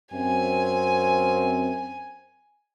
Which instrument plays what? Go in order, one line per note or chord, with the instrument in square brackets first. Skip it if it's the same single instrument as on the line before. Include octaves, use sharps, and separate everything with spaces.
[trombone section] F#2 C4 [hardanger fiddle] G#5